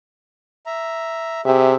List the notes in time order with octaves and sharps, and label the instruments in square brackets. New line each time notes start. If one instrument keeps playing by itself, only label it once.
[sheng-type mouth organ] E5 A#5
[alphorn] C3 [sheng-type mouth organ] G4 G#4 E5